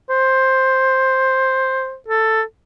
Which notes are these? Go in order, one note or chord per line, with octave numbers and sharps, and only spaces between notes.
C5
A4